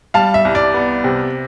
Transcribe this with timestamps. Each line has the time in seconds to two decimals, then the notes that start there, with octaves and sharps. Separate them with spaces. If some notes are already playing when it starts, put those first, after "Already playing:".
0.14 G3 F5 A5
0.34 E5
0.45 C2
0.55 D5
0.74 B3
1.04 C3